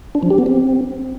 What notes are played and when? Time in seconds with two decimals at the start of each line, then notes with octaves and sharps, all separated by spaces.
0.15 D4
0.23 F3
0.31 G4
0.38 B3
0.46 C4